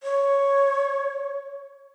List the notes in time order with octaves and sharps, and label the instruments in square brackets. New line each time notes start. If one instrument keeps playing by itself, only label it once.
[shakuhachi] C#5